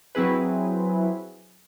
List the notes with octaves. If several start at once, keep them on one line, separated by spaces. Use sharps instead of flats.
F#3 C4 E4 G#4 B4